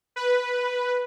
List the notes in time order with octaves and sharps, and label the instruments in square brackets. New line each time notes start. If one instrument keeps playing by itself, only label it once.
[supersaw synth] B4